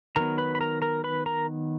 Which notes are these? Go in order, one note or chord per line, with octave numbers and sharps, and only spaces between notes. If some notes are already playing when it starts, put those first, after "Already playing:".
D#3 F#3 B3 A#4 A#5
B4 B5
B5
A#4 A#5
A#4 A#5
B4 B5
A#4 A#5